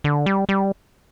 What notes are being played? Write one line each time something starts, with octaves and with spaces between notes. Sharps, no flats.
D3
G3
G3